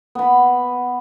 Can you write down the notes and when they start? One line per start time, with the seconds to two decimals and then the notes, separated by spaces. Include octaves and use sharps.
0.15 B3 B5